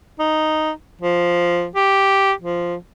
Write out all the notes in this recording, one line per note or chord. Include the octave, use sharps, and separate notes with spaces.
D#4
F3
G4
F3